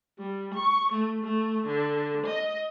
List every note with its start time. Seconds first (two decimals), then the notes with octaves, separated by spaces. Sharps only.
0.19 G3
0.54 C#6
0.93 A3
1.24 A3
1.67 D3
2.26 D#5